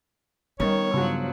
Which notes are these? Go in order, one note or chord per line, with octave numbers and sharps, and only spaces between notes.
D#3 G3 B3 C#4 D#4 C#5
G2 C#3 F3 F#3 F4 F#4